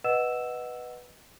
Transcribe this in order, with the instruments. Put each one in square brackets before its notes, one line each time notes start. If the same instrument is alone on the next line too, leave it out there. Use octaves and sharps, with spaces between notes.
[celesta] B4 D#5 F#5 E6 E7